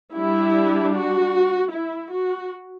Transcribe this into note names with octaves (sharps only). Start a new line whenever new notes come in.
G3 D4 E4
F#4
E4
F#4